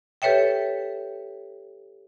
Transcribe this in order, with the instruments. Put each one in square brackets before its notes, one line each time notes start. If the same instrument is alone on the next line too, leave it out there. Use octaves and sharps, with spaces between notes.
[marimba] G4 A4 B4 C#5 E5 G5